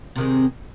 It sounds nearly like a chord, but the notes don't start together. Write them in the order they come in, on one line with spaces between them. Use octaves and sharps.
C3 D#3 G#3